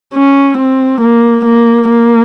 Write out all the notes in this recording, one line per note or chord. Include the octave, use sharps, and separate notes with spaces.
C#4
C4
A#3
A#3
A#3